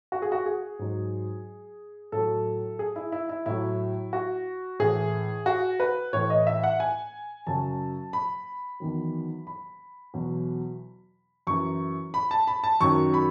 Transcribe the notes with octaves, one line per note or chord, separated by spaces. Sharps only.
F#4
G#4
F#4
G#4
G#2 F#3
A2 F#3 A4
G#4
E4
E4
E4
A2 F#3 E4
F#4
A2 E3 G#4
F#4
B4
A2 E3 C#5
D#5
E5
F#5
G#5
F#2 C#3 F#3 A5
B5
E2 D#3 F#3
B5
E2 B2 F#3
F#2 E3 C#6
B5
A5
B5
A5
F#2 D#3 F#3 C#6
B5